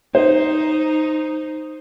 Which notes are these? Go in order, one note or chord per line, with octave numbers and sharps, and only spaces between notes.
D#4 C5